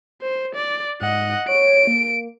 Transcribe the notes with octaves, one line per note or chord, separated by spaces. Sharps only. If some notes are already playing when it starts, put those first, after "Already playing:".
C5
D5
G#2 D#5 F#5
C#5 D7
A#3